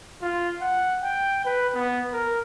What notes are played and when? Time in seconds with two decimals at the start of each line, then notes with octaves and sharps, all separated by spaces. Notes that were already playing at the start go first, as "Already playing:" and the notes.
0.22 F4
0.61 F#5
1.03 G5
1.45 B4
1.75 B3
2.13 A#4